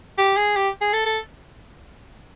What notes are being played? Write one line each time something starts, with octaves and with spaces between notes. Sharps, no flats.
G4
G#4
G4
G#4
A4
A4